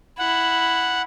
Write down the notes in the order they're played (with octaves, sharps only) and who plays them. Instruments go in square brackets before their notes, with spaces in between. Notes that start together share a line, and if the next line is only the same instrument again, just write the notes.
[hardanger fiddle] E4 [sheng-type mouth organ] F#5